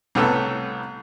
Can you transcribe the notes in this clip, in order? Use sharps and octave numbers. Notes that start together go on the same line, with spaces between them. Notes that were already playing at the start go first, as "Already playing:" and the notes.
C2 A2 B3 A4 E6